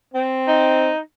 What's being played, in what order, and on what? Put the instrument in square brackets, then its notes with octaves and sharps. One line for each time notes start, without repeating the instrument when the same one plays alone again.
[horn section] C4
[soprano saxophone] D#4